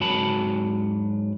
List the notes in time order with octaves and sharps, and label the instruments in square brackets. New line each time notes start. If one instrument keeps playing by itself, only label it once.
[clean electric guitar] G#2 F#3 F#4 A5 B5